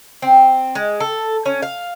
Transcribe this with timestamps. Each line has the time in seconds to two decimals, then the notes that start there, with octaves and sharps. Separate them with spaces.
0.22 C4
0.75 G#3
1.00 A4
1.46 C#4
1.63 F5